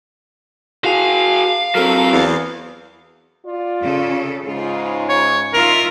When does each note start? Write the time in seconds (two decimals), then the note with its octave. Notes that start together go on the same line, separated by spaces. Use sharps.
0.85 F#4 G#4 F5
1.75 F#3 C4 A4 A#4
2.12 E2
3.46 F4 D5
3.81 C#3 A4
4.45 G#2 C#3 F4
5.09 C#5
5.53 D#4 F4 A#4 E5